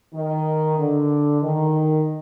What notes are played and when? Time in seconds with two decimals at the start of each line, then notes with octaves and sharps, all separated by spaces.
0.13 D#3
0.77 D3
1.41 D#3